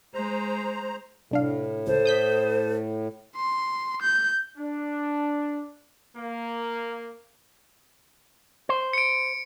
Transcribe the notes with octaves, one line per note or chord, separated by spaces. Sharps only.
G#3 C5 A#5
C2 A2 D4 F5
C#2 A4 C5
D#6 G6 B6
C6
G6
D4
A#3
C5
C#7 D7